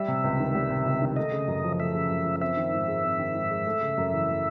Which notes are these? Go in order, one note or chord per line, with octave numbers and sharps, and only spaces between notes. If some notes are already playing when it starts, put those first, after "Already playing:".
Already playing: G3 E5
C3
C#2
D#3
G3
C3
C#2
D#3
A3 D#5
C#3
F#2
F3
A3 E5
C#3
F#2
F3
C4 E5
D#3
G#2
G#3
C4
D#3
G#2
G#3
A3
C#3
F#2
E3
A3